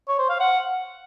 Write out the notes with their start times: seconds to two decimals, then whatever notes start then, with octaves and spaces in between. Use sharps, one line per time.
0.08 C#5
0.19 C5
0.29 F5
0.40 F#5